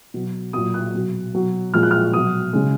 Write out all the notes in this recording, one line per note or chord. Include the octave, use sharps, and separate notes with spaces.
B2 F#3
A#2 F#3 D#6
F#6
B2 F#3
B2 F#3
A#2 F3 G#3 F6
F#6
F6
B2 F#3 D#6
C#3 G#3